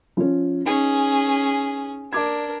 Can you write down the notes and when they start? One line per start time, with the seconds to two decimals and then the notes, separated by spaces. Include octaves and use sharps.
0.17 F3 C#4
0.65 C#4 D#4 G#4
2.13 D4 A#4 D5 D6 G#6